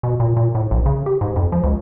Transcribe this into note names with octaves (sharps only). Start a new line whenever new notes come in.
B2
A#2
A#2
A2
A#1
C#3
G4
G#2
F2
F3
C#2